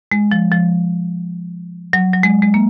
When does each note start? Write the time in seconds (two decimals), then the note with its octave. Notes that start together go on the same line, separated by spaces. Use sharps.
0.12 G#3
0.31 F3
0.52 F3
1.93 F#3
2.13 F#3
2.23 G#3
2.42 G#3
2.54 A#3